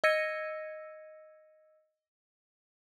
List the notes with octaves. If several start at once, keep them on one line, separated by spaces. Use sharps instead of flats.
D#5 E6 G#6 A#6 C#7 D#7